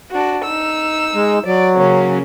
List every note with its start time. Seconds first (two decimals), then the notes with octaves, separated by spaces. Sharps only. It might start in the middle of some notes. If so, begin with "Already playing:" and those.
0.10 D4 F#4
0.44 D#4 E6
1.15 G#3
1.46 F#3 D5
1.77 C#3 A#3 C#4